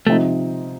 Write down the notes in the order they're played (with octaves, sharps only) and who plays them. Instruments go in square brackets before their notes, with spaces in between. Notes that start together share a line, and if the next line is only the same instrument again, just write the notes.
[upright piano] C3 F3 C4 D#4 [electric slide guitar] A3